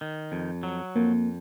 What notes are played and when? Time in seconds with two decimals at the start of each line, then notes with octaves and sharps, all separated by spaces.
0.01 D#3
0.32 F2
0.63 F#3
0.96 F2 A#3